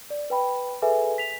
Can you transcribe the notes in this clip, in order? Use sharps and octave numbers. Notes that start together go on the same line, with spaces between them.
D5
B4 G5 B5
G#4 A4 B4 E5 G#5
B6 F7